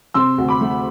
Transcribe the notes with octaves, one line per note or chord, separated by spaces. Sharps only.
C3 C6 E6
D2
B5 D6
A3